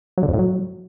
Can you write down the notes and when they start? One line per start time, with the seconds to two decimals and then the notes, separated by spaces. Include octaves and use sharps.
0.18 F#3
0.23 D3
0.28 F2
0.34 A2
0.39 F#3